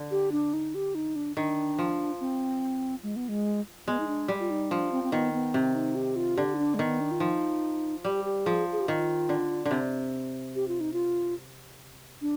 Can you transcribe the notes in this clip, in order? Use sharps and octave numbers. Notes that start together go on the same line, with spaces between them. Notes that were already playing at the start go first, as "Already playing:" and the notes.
Already playing: D3
G4
D4
D#4
G4
D#4
D4
D#3 D4
F3
C4
G#3
B3
G#3
G#3 B3
D#4
D4
G3
F4
D#4
F3 D4
C4
C4
D#3 B3
B3
C3 C4
D#4
G4
F4
D3 G4
D#4
D4
G#3
D#3 B3
D4
F4
F3 D#4
G3 G4
G4
F3 G#4
G#4
G4
D#3 F4
D3
D3
C3
G4
F4
D#4
F4
D4